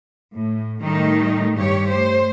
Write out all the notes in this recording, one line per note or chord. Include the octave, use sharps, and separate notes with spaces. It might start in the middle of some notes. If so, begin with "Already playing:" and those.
A2
A2 D#3 G3 A3 D#4
G2 G4 C#5
A3 C5